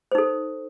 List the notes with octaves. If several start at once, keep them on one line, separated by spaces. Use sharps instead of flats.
D#4 A4 C5